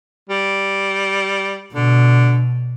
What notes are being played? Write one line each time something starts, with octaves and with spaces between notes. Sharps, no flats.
G3
B2 D3